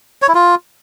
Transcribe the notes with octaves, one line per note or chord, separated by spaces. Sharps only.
C#5
E4
F4